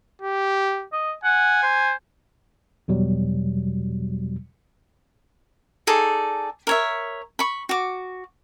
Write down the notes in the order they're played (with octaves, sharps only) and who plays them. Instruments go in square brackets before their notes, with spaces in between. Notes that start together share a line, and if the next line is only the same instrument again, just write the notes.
[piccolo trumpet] G4
[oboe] D#5
[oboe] F#5 [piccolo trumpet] G#5
[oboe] C5
[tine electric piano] E2 B2 F#3 G3
[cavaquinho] D#4 G#4 A4 D5
A#4 C#5 E5
B5 C#6
F#4 D6